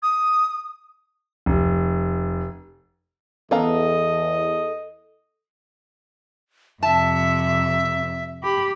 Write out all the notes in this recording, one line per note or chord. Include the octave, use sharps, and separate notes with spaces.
D#6
F1
E2 B3 A4 D#5 F5 A#5
F2 C3 E5 A5
G4 B5